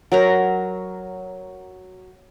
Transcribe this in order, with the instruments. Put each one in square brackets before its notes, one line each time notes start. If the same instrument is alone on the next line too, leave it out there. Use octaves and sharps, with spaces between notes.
[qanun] F#3 A#4 A#5